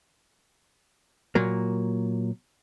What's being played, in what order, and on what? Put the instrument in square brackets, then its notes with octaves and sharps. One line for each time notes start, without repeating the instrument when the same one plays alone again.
[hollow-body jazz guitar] A#2 F#3 A#3